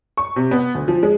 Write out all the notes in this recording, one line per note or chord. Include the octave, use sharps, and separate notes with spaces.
C#6
C3
B3
D2
F3
G#3